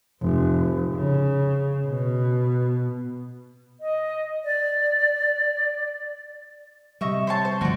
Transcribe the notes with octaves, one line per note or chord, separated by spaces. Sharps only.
F1
C#3
B2
D#5
D5
C3 G3 D#5 E5 C#6
C5 C#5 A5
C5
G1 F3 A3 F#4 D5